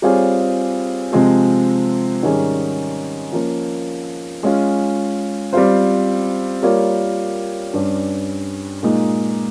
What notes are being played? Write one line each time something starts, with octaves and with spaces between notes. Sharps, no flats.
G3 C4 F4 G#4 C#5
C3 F3 G#3 C4
G#2 D#3 G3 C#4 G#4
F3 A#3 C#4
G#3 C#4 F4
G3 C4 F4 C5
G3 A#3 F4 A#4 C#5
G2 G3 C#4
A#2 G#3 D#4